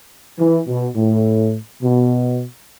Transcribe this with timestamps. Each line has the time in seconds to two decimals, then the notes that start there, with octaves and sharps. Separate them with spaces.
0.39 E3
0.67 B2
0.96 A2
1.83 B2